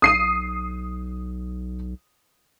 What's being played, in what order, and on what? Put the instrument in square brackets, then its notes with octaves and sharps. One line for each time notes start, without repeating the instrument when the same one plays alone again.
[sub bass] B1 [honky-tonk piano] D#6 C7 D#7